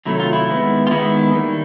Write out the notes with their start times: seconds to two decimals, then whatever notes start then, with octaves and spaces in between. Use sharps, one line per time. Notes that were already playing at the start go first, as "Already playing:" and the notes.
0.05 C3 D#3 F#3 A3 E4
0.20 F4
0.33 E4
0.48 D#3 G#3 B3
0.87 F4
0.91 D#3 G#3 B3 E4
1.33 D#3 G3 A#3